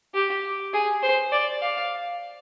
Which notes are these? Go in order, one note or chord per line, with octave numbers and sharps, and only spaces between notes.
G4
G#4
C5
D5
F5